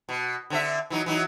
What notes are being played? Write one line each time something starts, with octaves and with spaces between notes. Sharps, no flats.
B2
D3 C4 E5
E3 F#3 D#4
E3 F#3 D#4